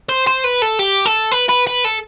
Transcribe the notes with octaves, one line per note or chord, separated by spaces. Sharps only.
C5
C5
B4
A4
G4
A4
B4
B4
B4
A4